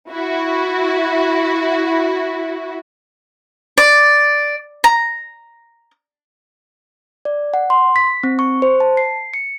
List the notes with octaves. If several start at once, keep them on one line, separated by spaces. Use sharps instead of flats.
E4 F#4
D5
A#5
D5
F#5
C6
B6
C4
C#6
C5
A5
C7
C#7